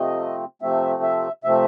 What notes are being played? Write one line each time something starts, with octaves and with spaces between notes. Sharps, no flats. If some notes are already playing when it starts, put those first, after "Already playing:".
Already playing: C3 F3 A3 C4 D#5
C3 F3 A3 C4 E5
E5
C3 F3 A3 C4 E5